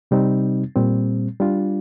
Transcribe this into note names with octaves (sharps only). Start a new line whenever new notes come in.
C3 G3 C4 D#4
A#2 G3 C4
G3 D4 F4